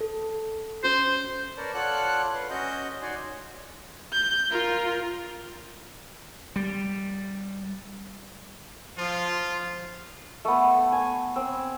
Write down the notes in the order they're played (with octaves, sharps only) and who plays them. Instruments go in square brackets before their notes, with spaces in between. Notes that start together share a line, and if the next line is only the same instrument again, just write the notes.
[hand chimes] A4
[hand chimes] C#4 F#4 [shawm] C5
[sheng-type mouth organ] A#4 B4 C#5 D5 A5
F4 A4 C#5 D5 F#5 F#6
B4 C6
C#4 F#4 D#5 G6
D#4 F#4 C#5 D5 G#5 C6
[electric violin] G6
F4 A#4
[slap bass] G3
[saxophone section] F3 [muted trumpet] F4
[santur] A3 B3
G#5
C4